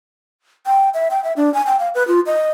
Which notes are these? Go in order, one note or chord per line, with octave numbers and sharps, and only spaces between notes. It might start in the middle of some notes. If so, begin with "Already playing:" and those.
G5
E5
G5
E5
D4
G#5
G5
F5
B4
F4
D#5